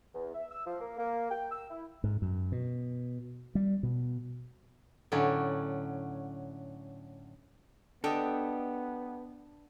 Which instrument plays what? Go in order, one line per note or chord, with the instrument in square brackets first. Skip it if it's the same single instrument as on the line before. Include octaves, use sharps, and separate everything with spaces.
[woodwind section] E2
E5
E6
F3
A#3
A#3
G5
E6
E4
[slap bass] G#2
F#2
B2
G3
B2
[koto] A2 D3 F#3 C#4
[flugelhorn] B3 [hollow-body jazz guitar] D4 A4 [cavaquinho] G4 D#5 E5